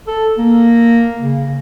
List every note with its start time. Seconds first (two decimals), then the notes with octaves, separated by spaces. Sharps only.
0.07 A4
0.38 A#3
1.19 C#3